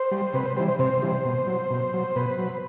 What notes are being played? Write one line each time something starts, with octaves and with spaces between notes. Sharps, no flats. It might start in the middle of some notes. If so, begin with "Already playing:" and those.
Already playing: C5
G3
C3 B4
C5
E3 G3 C5
C5
C3 C5
E3 G3
B2
F#3
B2
F#3
B2 B4
F#3